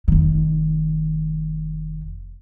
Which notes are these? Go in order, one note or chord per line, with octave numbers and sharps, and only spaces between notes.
F1 D#3